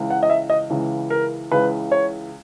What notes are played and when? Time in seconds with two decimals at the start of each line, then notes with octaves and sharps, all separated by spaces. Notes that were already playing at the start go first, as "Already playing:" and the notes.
Already playing: C#2 C#3 E3
0.10 F#5
0.23 D#5
0.30 E5
0.50 D#5
0.70 C#2 C#3 E3
1.10 A#4
1.52 C#2 C#3 E3 B4
1.92 C#5